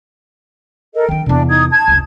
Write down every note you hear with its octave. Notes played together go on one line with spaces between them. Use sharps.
A4 A#4 D#5
D#3 D4 G5
E2 C3 D4
D#4 D#6 G#6
A5 G#6
F1 C#2